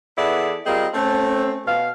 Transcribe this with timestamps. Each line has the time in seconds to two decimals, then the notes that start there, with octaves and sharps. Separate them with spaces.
0.17 E3 B3 E4 G#4 A4 D5
0.66 G3 C4 F4 G#4 A#4 D#5
0.94 A3 C4 C#4
1.67 B2 F5